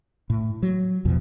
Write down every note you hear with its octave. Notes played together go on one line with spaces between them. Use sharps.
A2
F#3
A1 E2 B2 F3